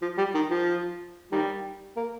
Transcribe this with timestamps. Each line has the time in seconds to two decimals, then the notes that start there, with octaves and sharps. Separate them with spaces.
0.02 F3
0.18 G3
0.35 D#3
0.50 F3
1.32 D#3 G3
1.97 A#3